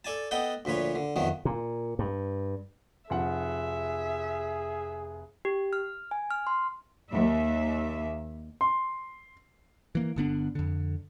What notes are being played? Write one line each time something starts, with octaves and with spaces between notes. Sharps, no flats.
A4 D5 G#5 A5
B3 A4 D#5 F#5 G5
D2 A#2 F3 B4 C#5
D3
F2 D#3 E3 F#3 B3
A#2
G2
F1 F3 G#4 E5 F#5
G4
F6
G#5
F6
C6
D#2 E5
C6
E3 A#3
G1 D3 B3 D4
F2 D3